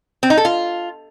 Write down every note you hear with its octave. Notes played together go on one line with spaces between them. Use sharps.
C4
D#4
A4
F4